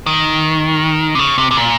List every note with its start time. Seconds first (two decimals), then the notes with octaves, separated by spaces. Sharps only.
0.06 D#3
1.15 C3
1.19 C#3
1.38 C3
1.51 C3
1.57 A#2